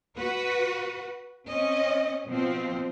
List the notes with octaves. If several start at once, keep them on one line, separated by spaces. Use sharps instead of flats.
F#4 B4
C4 C#4 D#5
B2 F3 C4